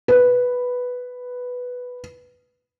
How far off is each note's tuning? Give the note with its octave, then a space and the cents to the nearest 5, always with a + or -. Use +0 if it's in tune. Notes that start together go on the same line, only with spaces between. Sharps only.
B4 +0